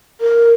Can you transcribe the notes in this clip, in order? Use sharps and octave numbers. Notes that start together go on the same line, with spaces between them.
A#4